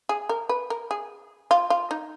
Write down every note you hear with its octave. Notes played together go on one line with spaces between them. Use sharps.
G#4
A#4
B4
A#4
G#4
F4
F4
D#4